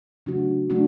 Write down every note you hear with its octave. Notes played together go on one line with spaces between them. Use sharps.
C#3 F#3 A3 D4 F#4
C#3 F#3 A3 D4 F#4